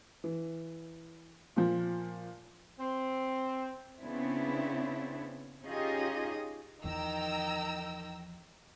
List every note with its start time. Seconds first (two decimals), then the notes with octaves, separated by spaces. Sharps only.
0.24 E3
1.56 A#2 F3
2.79 C4
4.00 C#3 B3 C4 D4 E4
5.64 C#4 D#4 F4 G4 G#4 D#5
6.84 E2 D#3 F3 G5 A#5 E6